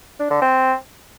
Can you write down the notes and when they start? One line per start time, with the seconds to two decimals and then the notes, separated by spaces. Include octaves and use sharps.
0.19 D4
0.30 D3
0.41 C4